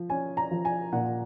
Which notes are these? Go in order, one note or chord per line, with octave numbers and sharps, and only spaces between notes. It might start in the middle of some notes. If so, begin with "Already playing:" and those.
Already playing: F3
C#4 G#5
A#5
F3
G#5
A#2 F#5